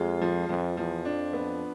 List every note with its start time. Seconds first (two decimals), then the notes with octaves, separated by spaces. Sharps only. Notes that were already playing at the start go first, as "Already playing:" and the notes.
Already playing: F2 G#3 F4
0.21 F3
0.49 F2 F3
0.77 E2 F3
1.05 F2 D4
1.33 B3